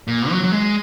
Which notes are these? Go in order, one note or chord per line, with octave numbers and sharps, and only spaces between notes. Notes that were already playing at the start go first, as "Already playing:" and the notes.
A#2
F#3
F#3
G#3